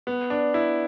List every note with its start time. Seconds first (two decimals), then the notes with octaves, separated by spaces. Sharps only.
0.07 B3
0.30 D4
0.54 E4